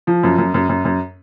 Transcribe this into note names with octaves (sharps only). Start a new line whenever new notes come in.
F3
F#2
F#2
F#2
F#2
F#2